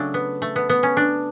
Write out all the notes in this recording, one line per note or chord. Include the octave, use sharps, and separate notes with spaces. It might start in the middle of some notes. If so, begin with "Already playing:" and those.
Already playing: C#3 F#3 A3 D4
B3
A3
B3
B3
C#4
D4